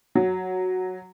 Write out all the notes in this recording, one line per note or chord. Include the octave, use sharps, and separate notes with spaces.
F#3